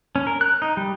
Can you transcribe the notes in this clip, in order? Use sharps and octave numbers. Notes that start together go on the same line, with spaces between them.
C#4
A#4
F#6
D#4
G3